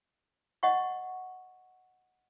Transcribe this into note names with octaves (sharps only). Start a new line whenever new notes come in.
D#5 F#5 C#6